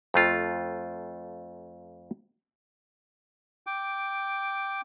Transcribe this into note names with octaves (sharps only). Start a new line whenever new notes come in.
F2 A3 F4
G5 D6